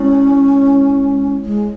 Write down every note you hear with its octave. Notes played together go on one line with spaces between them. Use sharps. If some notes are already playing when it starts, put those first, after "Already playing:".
Already playing: G#3 C#4 E4 C#5
G#3